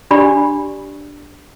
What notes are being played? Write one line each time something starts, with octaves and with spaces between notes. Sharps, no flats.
D4 G4 D5 B5